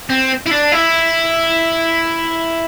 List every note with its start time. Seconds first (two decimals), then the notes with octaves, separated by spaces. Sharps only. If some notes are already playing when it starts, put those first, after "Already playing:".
0.10 C4
0.46 E4
0.51 D4
0.72 E4